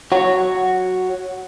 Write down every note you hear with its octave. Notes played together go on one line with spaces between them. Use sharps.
F#4 C#5